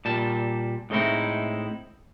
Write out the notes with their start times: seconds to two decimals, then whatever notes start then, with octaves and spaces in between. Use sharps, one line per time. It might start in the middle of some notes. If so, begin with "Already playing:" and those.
0.05 A#2 G3 A5
0.90 A2 G#3 A3 C4 D#4 E4